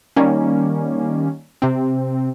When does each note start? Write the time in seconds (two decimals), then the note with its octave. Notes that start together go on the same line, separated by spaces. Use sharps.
0.16 D#3 G3 A#3 C#4
1.62 C3 C4